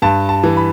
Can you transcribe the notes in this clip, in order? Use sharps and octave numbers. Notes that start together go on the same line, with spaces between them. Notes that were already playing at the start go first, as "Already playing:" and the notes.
G2 A5
A5
E3
B5